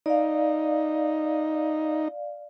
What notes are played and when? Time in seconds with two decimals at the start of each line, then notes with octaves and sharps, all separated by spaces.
0.06 D#4 D5 F5